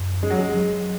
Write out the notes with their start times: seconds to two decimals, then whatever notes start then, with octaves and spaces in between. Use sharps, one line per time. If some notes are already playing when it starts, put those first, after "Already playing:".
Already playing: F#2
0.23 G#3 C#4
0.30 F#3
0.37 G#3
0.54 F#3